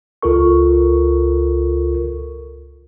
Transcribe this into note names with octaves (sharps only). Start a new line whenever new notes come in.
C#2 F4 A4 A#4 C#6